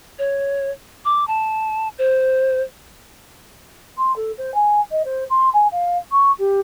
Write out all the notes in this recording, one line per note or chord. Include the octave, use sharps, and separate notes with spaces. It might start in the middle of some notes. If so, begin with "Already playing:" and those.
C#5
D6
A5
C5
C6
A4
C5
G#5
D#5
C5
C6
G#5
F5
C#6
G4